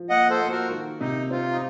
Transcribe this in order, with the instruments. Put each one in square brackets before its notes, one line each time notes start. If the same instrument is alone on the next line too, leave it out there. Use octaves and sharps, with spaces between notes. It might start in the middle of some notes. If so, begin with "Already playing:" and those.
Already playing: [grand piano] F3
[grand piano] A#3 [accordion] D#5 F#5
[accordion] A4 C5
[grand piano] A#3
[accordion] F#4 A#4
[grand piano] D#3
[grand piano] C3 [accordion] D#4
[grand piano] C4 [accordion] F4
[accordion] D#4